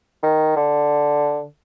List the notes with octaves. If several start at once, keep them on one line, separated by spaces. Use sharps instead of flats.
D#3
D3